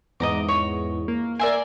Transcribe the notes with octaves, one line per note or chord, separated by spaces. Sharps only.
E2 G#2 D#5 A#5 D6
C#5
A#3
A#4 D5 E5 G#5 C6